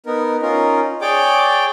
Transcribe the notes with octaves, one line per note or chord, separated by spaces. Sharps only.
B3 D#4 A#4
C#4 D#4 F4 A#4
G#4 C#5 D5 G5 D6